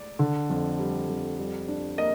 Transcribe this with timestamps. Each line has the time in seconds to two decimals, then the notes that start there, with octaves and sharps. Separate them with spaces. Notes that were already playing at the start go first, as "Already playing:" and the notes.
Already playing: D5
0.19 D3
0.50 F2
0.79 G3
1.09 F2
1.39 G3
1.68 D4
1.98 A#3 D#5